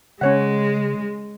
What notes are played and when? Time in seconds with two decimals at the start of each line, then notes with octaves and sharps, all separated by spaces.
0.21 C#3 G#3 C#4 C#5 F#5